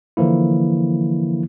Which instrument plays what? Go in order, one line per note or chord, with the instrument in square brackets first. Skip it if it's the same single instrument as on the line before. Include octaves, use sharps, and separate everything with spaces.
[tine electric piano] D3 E3 F3 A#3 E4